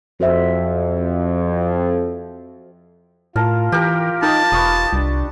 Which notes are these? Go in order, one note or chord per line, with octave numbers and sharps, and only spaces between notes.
F2 F#4 C5 E5
A2 F4 A#4 A5
E3 G4 A#4
D#4 A#4 D#5 G5 A5
E1 B4 C#6 D#6
C2 D4